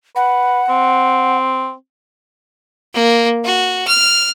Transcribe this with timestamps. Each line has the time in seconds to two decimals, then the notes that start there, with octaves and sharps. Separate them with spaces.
0.16 B4 F#5
0.69 C4
2.94 A#3
3.45 F#4
3.87 F6